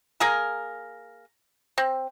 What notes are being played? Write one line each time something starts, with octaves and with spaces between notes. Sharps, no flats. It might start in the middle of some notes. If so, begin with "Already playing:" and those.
A#3 G#4 A#4
C4